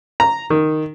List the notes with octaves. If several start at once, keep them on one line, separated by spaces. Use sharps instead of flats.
A#5
D#3